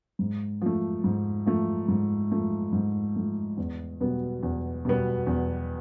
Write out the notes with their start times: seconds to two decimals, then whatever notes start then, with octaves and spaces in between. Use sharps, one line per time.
0.19 G#2
0.62 F3 A3
1.04 G#2
1.46 F3 A3
1.88 G#2
2.32 F3 A3
2.73 G#2
3.16 F3 A3
3.57 E2
4.00 B2 G3 B3
4.43 E2
4.85 B2 G3 B3
5.27 E2